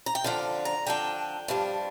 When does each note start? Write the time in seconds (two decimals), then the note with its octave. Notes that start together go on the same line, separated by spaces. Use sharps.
0.06 A#5
0.15 G5
0.24 D3 F3 D4 F5
0.65 A#5
0.86 D3 F3 D4 G5
1.48 G2 F3 D4